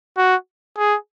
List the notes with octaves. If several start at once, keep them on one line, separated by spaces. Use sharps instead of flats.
F#4
G#4